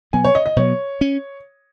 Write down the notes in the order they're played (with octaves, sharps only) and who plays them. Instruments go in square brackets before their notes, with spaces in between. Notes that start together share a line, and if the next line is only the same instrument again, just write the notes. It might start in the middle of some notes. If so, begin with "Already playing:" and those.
[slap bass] B2 F#3 B3 [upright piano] G#5
[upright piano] C#5
D#5
D#5
[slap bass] B2 F#3 B3 [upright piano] C#5
[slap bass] C#4